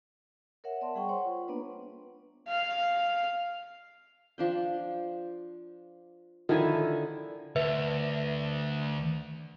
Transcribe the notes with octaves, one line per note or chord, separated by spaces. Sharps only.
A#4 C#5 E5 F#5
B3 D5 E5 A5 C6
G3 G#4 F#5 G5 C#6
C5 C#5 F#5 C6
F4
A#3 B3 D4 B4
F5
F3 D4 G5
D3 D#3 F3 E4 G#5
D2 B4 E5